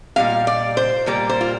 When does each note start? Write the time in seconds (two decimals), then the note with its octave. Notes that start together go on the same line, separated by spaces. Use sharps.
0.16 A#2 G3 A#3 F5
0.47 D5
0.77 C5
1.06 A#2 G3 A#3 D5
1.29 C5
1.41 F4